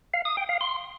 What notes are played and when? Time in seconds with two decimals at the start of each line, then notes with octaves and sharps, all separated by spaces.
0.14 F5
0.25 D#6
0.37 G5
0.49 F5
0.61 C6